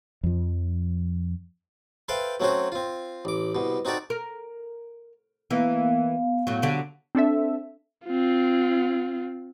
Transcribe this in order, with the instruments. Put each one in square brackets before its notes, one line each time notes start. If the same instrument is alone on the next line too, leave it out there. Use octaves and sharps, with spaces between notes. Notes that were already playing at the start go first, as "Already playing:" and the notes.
[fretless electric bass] F2 F3
[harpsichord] A4 B4 C5 E5 F5 G5
F#3 A3 C4 C#4 F#4 C5
C4 F4
A1 D6
C2 B2
C4 D#4 F#4 A4 D5
[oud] A#4
[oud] E3 A#3 [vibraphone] B3 F5
[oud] A2 F#3
D3 F#3 G3
[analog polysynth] C4 D4 A4 E5
[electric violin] C4 F4